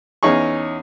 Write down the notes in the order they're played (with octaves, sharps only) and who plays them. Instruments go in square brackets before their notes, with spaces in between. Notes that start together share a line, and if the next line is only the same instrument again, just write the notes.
[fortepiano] E2 C#4 D#4 G#4 C#6